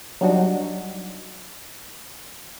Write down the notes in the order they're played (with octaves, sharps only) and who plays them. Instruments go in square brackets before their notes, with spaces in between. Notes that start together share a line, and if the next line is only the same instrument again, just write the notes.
[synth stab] F#3 G3 D4 D#4 F#4